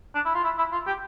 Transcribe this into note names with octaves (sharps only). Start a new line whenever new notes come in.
D4
E4
F4
E4
E4
F4
G4